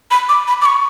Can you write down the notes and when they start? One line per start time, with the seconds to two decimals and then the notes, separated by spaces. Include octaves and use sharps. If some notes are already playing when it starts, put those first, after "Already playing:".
0.11 B5
0.29 D6
0.48 B5
0.61 D6
0.65 C#6